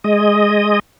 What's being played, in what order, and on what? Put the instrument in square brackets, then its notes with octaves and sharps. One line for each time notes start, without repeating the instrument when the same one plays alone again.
[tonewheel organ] G#3 D#5